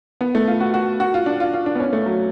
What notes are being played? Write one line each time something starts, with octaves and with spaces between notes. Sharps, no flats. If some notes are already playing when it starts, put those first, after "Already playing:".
B3
A3
F4
F#4
F#4
F#4
F4
D4
F4
F4
D4
B3
C#4
A3
F#3